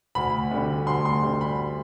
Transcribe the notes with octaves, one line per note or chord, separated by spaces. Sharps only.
D2 B5
D3 G3
D2 C6
C6
D3 G3
B5